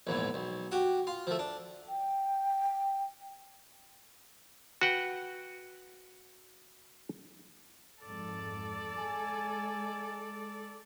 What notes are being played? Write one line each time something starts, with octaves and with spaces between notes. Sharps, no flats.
A#1 E2 G#2
B1
F#4 G4
F4
F3 A3
D4
G5
F#4 B4 F#5 G5
G#1 F2 G#2 A4 D5
G#3 G#5